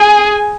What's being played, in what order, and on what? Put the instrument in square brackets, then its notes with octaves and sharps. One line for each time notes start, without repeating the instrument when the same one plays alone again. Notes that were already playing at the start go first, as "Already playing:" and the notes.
Already playing: [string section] G#4 [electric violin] G#5